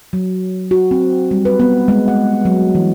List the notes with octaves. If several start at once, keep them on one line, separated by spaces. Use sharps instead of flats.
F#3
F#4
C4
G3
B4
B3
G#3
F#5
F#3
E3